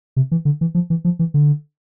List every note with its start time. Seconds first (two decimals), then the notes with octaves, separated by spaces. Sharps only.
0.16 C3
0.31 E3
0.45 D3
0.61 E3
0.75 F3
0.90 E3
1.05 F3
1.19 E3
1.34 D3